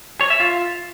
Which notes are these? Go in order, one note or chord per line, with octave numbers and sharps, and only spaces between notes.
C#5
E5
F4